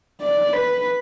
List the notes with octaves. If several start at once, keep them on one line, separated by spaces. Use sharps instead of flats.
D5
B4